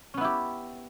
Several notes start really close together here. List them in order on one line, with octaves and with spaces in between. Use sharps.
C#4 B3 E4 G4